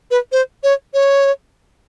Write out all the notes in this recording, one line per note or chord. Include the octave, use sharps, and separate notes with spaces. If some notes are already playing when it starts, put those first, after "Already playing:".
B4
C5
C#5
C#5